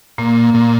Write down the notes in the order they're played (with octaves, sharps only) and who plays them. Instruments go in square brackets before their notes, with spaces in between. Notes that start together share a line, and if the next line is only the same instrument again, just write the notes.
[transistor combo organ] A#2 [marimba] A#3
[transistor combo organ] A#2